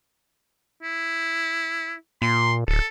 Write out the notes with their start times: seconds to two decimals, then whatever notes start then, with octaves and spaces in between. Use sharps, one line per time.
0.83 E4
2.22 A#2 C6
2.68 D1 A4